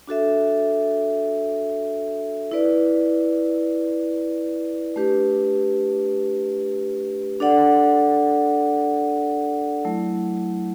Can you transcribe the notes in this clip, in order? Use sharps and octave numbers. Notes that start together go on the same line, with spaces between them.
D4 F#4 A4 E5
E4 B4 D5
A3 D4 G4 B4
D4 A4 D5 F#5
F#3 A3 E4